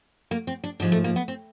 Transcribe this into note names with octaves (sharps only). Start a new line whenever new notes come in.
A#3
C4
D4
G#2 F3 G#3 D4
A3
A#3
B3
C4